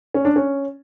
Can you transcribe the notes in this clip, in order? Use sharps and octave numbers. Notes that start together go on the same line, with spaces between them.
C#4
D4
C#4